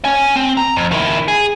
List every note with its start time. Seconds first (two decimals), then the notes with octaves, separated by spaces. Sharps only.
0.05 C#4 G#5
0.36 C4
0.57 A#5
0.76 F2
0.92 D#3 E4
1.28 G#4